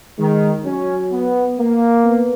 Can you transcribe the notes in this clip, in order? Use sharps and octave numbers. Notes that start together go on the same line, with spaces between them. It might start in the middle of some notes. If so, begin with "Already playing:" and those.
D#3 G#3
F#3 C#4
B3
A#3
B3